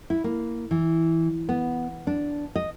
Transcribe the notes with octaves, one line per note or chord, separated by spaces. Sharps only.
E4
A#3
E3
B3
D4
D#5